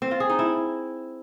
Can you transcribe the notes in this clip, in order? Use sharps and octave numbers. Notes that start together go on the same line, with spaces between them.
C4
F4
G#4
D#4
E4